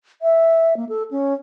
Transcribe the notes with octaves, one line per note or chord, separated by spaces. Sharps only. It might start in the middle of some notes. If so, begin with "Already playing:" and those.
E5
A#3
A4
C#4